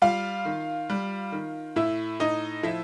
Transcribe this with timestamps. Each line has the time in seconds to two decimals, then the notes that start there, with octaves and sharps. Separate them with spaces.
0.02 G3 F4 F5
0.45 D#3
0.90 G3
1.32 D#3
1.76 A2 E4 E5
2.20 A2 D#4 D#5
2.63 F3 E4 E5